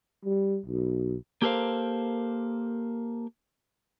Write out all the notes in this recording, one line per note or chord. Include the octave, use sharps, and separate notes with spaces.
G3
B1
A#3 G4 A4 A#4 C5 F5